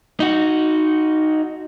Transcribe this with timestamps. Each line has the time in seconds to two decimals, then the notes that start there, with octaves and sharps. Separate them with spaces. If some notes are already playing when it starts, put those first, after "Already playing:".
0.20 D#4 F#4